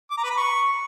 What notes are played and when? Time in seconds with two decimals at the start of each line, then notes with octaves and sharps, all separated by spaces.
0.11 D6
0.17 A#5
0.24 B4
0.31 B5
0.37 C#6